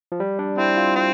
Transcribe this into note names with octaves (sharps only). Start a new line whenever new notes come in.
F3
G3
D4
C4 E4
F4
C4